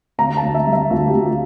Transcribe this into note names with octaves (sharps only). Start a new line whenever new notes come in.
D2 A#5
A5
D2
E5
G3
E5
D2 F4
G4
D2
F4